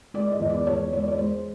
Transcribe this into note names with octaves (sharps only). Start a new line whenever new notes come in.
G#3 D5
D#5
E2
D5
E2 C#5
G#3 C#5
D5
C#5
G#3 C5